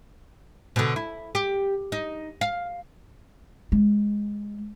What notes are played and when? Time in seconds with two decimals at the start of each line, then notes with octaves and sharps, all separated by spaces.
0.76 B2 D3
0.96 E4
1.35 G4
1.92 D#4
2.41 F5
3.72 G#3